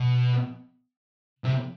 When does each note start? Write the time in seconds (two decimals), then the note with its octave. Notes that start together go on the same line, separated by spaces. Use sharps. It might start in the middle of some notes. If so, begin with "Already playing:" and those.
Already playing: B2
1.44 C3